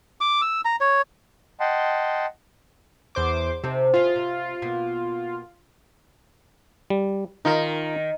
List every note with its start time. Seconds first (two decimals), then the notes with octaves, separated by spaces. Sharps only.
0.21 D6
0.42 E6
0.65 A#5
0.81 C#5
1.60 D#5 F#5 G5 A5 C6
3.15 E2 C5 D6
3.64 C3 C4 D#4 A4
3.94 E4 F4 G#4
4.16 C3
4.62 B2 A#3 B3
6.90 G3
7.45 D#3 D#4 F4 A#4